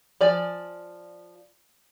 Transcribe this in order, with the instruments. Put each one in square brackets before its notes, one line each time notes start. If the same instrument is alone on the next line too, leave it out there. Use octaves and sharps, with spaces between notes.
[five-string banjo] F3 D5 G#5